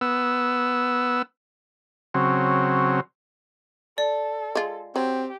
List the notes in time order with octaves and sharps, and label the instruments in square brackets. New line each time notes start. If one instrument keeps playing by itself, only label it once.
[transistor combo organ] B3 E6
C#3 F#3 C4
[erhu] A4 [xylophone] D5
[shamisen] G#3 F4
[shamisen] F#3 [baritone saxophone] C4 [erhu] G4